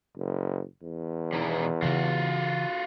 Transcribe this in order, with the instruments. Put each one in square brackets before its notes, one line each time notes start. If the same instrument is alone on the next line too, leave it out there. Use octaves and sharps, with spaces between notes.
[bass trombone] F#1
E2
[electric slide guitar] B2 D#3 E3
[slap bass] C#3 E3 [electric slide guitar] F4 F#4